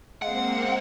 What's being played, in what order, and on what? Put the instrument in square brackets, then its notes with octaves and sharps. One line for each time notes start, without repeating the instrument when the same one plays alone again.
[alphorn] G#3 [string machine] A#3 C4 [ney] F5 [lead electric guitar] F#5